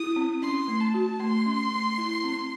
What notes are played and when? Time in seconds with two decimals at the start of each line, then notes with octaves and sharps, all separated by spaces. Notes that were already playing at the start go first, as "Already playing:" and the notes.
Already playing: E4 D#6
0.16 C4
0.42 C#4 C6
0.68 A3
0.81 A5
0.94 F#4
1.20 A3 C6
1.46 C#4
1.71 A3
1.98 E4
2.24 C4